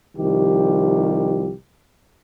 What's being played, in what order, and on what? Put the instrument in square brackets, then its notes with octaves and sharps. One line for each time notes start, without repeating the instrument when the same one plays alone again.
[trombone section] C2 D#3 F3 G4